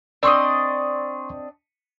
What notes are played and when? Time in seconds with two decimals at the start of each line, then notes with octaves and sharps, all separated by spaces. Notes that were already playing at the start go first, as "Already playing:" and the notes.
0.23 C4 D4 D5 D#5 C6 C#6